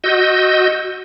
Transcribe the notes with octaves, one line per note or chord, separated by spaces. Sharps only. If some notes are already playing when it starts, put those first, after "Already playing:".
F#4 D#5 E6 G6